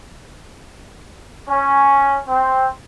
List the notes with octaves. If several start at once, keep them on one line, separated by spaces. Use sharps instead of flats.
C#4
C4